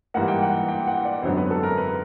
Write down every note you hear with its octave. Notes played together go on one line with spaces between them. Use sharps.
G#2 E3 G3 A#3 F#5
G5
F#5
G5
F#5
D5
G#1 F#2 D3 F#3 B3 C5
B4
A4
A#4
B4